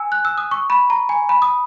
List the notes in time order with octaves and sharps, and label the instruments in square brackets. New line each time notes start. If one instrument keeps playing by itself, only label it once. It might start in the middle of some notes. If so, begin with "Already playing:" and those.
Already playing: [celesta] G#5 E6
F#6
E6
D#6
C#6
B5
A#5
G#5
B5
D#6